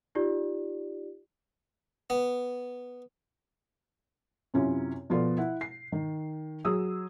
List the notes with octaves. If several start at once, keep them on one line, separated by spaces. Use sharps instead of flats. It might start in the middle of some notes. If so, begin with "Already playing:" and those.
D#4 F4 G4 D5
B3
F#2 C3 C#4 E4 F4
B2 F3 F4 A4 B4 D5
E4 F#5
C7
D#3
F#3 G#4 D#6 E6